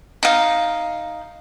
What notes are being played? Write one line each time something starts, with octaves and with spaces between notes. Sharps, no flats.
D#4 F5